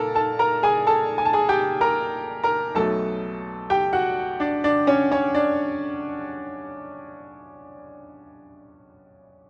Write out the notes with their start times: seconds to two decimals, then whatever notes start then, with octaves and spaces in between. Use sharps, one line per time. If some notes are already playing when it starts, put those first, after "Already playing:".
Already playing: A#2 A4 A#4 A5
0.15 A4 A5
0.39 A#4 A#5
0.63 G#4 G#5
0.87 A4 A5
1.18 G#5
1.25 A5
1.33 G#4 G#5
1.49 G4 G5
1.81 A#4 A#5
2.44 A#4 A#5
2.75 B1 B2 F#3 A3 A4 A5
3.70 G4 G5
3.93 F#4 F#5
4.40 D4 D5
4.64 D4 D5
4.87 C#4 C#5
5.12 C#4 C#5
5.35 D4 D5